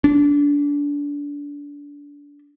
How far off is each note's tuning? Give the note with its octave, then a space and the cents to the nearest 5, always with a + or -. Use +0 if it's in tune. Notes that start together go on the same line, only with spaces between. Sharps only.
D4 -25